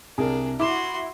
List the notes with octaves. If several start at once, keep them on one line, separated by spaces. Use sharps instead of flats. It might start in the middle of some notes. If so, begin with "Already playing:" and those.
C2 D4 G#4 A#4
E4 F#4 C6 D6 E7